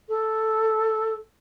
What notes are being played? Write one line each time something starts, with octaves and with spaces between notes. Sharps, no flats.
A4